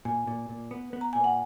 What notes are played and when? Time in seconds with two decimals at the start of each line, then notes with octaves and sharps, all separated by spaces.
0.05 A#2 G#5
0.27 A#2
0.49 A#2
0.71 B3
0.93 B3
1.01 A#5
1.13 A#2 G#5
1.24 F#5